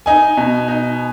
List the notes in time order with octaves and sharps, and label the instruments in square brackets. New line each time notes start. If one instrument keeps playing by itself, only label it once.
[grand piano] D#4 [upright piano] G#5
[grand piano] B2
D#4